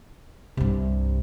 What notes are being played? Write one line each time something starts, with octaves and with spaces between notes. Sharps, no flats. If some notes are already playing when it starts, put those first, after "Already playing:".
C2 G2 C3